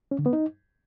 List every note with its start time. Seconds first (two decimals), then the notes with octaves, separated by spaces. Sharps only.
0.11 C#4
0.19 D3
0.26 B3
0.33 D#4